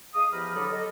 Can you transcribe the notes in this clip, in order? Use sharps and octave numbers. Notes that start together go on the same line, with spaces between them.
G#3 G#4 F5 D#6
E2 F3 G4 A#5 B5 F6
D3 F#3 A4 D5 B5 D#6
A4 D#5